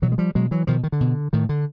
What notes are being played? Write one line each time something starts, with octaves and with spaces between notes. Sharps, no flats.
B2 E3 F#3
G#3
F3 G3
B2 F#3 G#3
E3 F#3
B2 D#3 F3
D#3
D3
B2
A2 D#3
D3